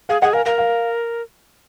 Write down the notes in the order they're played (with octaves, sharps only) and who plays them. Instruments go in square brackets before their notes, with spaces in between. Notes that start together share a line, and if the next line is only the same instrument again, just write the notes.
[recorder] G#4 [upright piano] F5
[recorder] G#4 [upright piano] D#5 F#5
[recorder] A#4 [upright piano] F5 G#5
[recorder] A#4 [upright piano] F5
[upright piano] F5